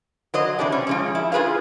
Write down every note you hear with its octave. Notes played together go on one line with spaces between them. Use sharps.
F#3 C5 D#5
C3 E3 D4 G4
C#4
F3 G#3 C#4
E4
F4 G#4 B4 C5 F5